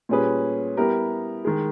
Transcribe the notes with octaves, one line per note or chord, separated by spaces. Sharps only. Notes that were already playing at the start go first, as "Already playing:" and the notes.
A#2 G3 C#4 G#4 B4
G3 B3 E4 G4 A#4
D#3 G#3